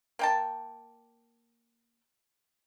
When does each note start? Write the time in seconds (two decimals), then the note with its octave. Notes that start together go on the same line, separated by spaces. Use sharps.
0.19 A#3 G5 A5